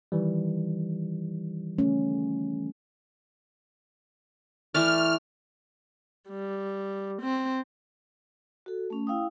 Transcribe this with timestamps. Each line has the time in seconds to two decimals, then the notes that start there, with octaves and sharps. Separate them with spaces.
0.12 D#3 E3 G3
1.79 A3 C#4
4.74 E3 A3 D5 F6
6.29 G3
7.22 C4
8.66 F#4 A4
8.90 A3 C#4
9.07 E4 F5 G5 D#6